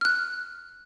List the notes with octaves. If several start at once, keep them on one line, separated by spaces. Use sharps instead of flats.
F6 F#6